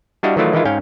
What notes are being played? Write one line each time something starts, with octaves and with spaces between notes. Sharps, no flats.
G3 D4 E4 F#4 D#5 F5
D#3 E3 F#3 A3 E4 F4
D#3 E3 G#3 E4 F4
G#2 C#4 F5 G5